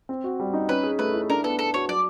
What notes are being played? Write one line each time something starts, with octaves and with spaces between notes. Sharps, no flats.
C4
F#4
G3
D#4
C#4 B4
G#4
A3 B4
E4
D4 A#4
B3 A4
B3 A4
F#4 C#5
F#3 D5